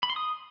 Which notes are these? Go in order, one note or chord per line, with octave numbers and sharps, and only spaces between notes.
B5
C6
D#6